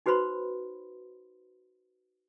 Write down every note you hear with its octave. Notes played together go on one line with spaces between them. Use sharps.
D#4 F#4 B4 C5 B5 C6